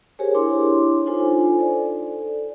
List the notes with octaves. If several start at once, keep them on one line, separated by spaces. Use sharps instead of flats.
G4 G#4 A#4 C5 C#5 G#5
D4 E4 G4 C#5 C6 D6
D4 D#4 F4 A4 C5 G#5
A4 D5